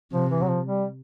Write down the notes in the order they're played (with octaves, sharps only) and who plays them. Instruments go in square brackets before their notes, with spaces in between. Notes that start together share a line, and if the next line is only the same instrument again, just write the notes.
[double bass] C3 [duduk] F3
[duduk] E3
F#3
F3
G3